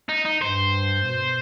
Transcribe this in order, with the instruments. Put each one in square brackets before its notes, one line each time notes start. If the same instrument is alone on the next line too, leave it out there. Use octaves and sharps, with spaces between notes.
[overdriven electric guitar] D#4
D#4
[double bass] G2 [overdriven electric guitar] C5
[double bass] B2